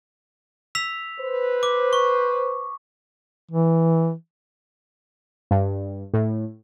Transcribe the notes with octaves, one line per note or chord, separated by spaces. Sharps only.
E6 B6 F7
B4 C5
D6
C#6
E3
G2
A2